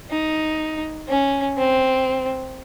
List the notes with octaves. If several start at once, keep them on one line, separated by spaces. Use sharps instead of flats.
D#4
C#4
C4